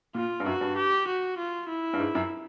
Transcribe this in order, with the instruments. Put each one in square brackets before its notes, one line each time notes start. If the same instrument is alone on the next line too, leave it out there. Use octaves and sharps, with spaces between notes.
[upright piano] A#2 [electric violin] F4
[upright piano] G2
[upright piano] F#2 [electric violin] F#4
[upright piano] G2
[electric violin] G4
F#4
F4
E4
[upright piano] G2
G#2
F#2